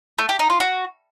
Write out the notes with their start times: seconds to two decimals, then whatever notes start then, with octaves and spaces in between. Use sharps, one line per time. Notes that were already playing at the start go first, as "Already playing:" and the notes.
0.19 A3
0.29 G4
0.39 D#4
0.50 F4
0.60 F#4